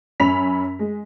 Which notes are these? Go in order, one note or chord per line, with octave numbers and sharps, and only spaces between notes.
F#2 C#4 B5 B6 F7
G#3